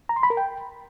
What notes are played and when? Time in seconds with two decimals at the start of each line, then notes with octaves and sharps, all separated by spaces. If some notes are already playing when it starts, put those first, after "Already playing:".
0.09 A#5
0.16 C6
0.23 B5
0.30 A#4
0.37 G5